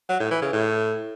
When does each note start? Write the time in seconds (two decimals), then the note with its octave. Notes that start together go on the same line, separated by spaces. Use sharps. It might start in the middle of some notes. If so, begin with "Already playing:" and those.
0.09 F#3
0.20 A2
0.31 E3
0.42 C#3
0.53 A2